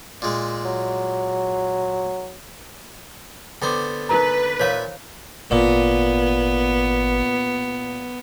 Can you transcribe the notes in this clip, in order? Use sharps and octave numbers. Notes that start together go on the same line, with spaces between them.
A#2 G#3
F#3
D3 B3 C5 G5 D6
D#4 A#4 B4 A#5
A#2 C5 C#5 E5 F5
G#1 A#2 B3